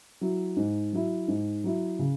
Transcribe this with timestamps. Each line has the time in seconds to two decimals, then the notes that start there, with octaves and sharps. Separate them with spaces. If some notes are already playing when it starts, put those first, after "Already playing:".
0.21 F#3 E4
0.57 G#2
0.93 F#3 E4
1.28 G#2
1.64 F#3 E4
1.99 C#3